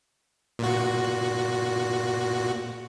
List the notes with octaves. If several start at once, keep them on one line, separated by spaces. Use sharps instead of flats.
A#2 F#4